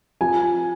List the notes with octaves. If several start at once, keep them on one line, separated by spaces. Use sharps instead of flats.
F3 G#5